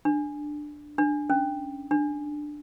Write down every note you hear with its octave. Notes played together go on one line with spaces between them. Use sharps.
D4
D4
C#4
D4